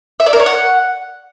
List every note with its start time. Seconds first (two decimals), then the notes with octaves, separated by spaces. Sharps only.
0.20 E5
0.26 D5
0.33 A#4
0.40 C#5
0.46 F#5